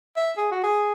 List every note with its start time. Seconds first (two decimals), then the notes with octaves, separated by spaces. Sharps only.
0.16 E5
0.37 G#4
0.51 F#4
0.63 G#4